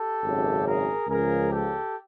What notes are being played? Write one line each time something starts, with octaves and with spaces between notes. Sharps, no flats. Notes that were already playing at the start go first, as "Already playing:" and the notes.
Already playing: G4 A4
G#1 F#2 C#3
G#4 A#4
C#2 C#3 F3 G#4 A#4
G4 A4